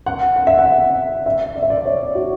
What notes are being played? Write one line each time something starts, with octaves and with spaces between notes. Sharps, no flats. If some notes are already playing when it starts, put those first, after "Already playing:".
F#5
F#5
E5
F#5
E5
D5
E5
D5
C#5
F#4